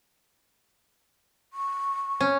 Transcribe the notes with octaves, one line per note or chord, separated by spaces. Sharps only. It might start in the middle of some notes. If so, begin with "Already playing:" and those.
C#6
C#4